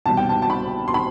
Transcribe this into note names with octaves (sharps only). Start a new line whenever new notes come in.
C2 B2 G3 B3 A5
G5
A5
A5
B5
C6
B5